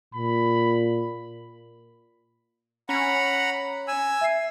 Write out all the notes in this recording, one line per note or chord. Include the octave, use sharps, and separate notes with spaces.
A#2 B5
C#4 F#5 A#5 B5
G#5 E6
E5 C7